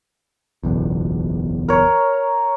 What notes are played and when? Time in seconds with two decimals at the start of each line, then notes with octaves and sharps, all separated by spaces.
0.63 F#1 B1 E2
1.68 A#4 C#5